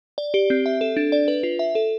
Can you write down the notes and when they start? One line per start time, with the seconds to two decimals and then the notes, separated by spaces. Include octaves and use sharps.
0.18 D5
0.34 G4
0.50 C4
0.66 E5
0.81 A4
0.97 D4
1.12 D5
1.28 B4
1.43 F4
1.59 E5
1.75 A4